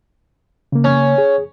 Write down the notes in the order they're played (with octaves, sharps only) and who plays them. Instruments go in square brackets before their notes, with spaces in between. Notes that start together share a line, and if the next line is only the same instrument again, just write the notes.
[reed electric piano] C#3 A#3
[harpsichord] C#4
[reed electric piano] G#4